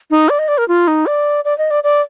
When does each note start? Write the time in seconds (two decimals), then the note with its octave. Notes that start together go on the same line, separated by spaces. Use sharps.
0.11 D#4
0.29 D5
0.39 D#5
0.48 D5
0.58 A#4
0.68 F4
0.88 D#4
1.06 D5
1.45 D5
1.58 D#5
1.71 D5
1.84 D5